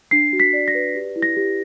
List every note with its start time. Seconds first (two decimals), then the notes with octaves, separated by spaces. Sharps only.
0.11 D4 C7
0.33 F#4
0.40 B6
0.53 D5
0.68 A#6
0.75 B4
0.95 G4
1.16 E4
1.22 A#6
1.37 G4